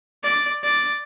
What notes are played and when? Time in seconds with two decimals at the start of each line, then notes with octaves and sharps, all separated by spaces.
0.23 D5
0.64 D5